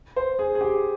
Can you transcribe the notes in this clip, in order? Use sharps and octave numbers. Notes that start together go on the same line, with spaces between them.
C5
G#4
G#4
G4